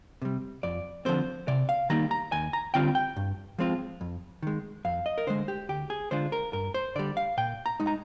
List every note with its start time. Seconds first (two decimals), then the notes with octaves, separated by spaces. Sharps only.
0.22 C3 G3
0.63 F2 D5
1.05 D3 F3 G#3 C4 C5
1.48 C3 D5
1.69 F5
1.90 D#3 G3 A#3 D#4 A#5
2.11 A#5
2.32 D#2 G#5
2.53 A#5
2.74 D3 G3 C4 F4 G5
2.95 G5
3.16 G2
3.59 F3 G#3 C4 F4
4.01 F2
4.42 D#3 G#3
4.85 F2 F5
5.06 D#5
5.18 A#4
5.27 D3 G#3 C5
5.48 G4
5.69 D2 G4
5.90 G#4
6.11 D3 G#3 D4 F4 C5
6.32 A#4
6.53 G2 A#4
6.74 C5
6.96 D3 G3 D5
7.17 F5
7.37 A#2 G5
7.66 A#5
7.80 G#3 D#4
7.87 A#5